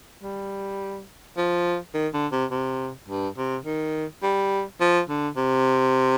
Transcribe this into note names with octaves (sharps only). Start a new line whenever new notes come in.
G3
F3
D#3
D3
C3
C3
G2
C3
D#3
G3
F3
D3
C3